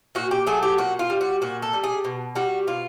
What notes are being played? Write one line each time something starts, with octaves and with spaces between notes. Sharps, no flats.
A#2 F#4
G4
F#3 A3 G#4
G4
A#2 F#4
F4
G3
F#4
A#2 F#4
A4
G3
G#4
B2
G3 F#4
B2 F4